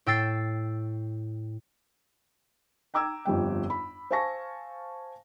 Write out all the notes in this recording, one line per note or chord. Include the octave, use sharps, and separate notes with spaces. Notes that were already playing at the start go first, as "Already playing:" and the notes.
A2 G5 E6 A6 C7
G5 A#5 D6 E6 G#6
G1 F2 G3 G5
B5
C5 F5 G#5 A5 C#6 A#6